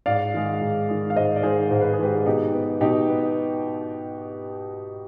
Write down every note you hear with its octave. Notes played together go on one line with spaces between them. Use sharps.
G#2 D5 F5
D#3 G#3
G#2
D#3 G#3
F5
G#2 C5 D#5
D5
D#3 G#3 G#4 C5
G#2 C5
B4
G#4
D#3 G#3 G4 B4
B2 D#4 G4
B3
B2 D#4 G4
B3